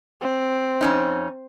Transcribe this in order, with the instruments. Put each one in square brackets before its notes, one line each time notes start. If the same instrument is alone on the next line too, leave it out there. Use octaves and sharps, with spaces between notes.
[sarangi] C4
[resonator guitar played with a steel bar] F2 C#4 D#4